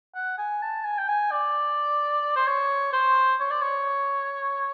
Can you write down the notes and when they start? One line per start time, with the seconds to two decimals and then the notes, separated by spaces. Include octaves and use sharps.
0.15 F#5
0.38 G#5
0.62 A5
0.84 G#5
0.98 G5
1.08 G#5
1.31 D5
2.36 C5
2.47 C#5
2.93 C5
3.40 C#5
3.51 D5
3.61 C#5